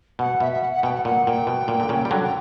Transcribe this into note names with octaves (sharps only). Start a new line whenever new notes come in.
B2 F#5
B2 E5
E5
F#5
F#5
B2 G5
F#5
A#2 F#5
A#2 G5
B2
A#2
D3
A#2 C#3
G3
D3 F#3
G5